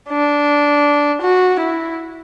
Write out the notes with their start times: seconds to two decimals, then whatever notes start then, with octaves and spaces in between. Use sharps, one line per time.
0.09 D4
1.22 F#4
1.60 E4